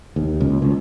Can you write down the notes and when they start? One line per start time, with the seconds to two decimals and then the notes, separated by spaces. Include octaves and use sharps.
0.16 D#2
0.40 C#2
0.62 C#2